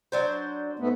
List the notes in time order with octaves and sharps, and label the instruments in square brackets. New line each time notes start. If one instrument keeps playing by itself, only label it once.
[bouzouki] F#3 D4 C5
[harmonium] G#2 A3 B3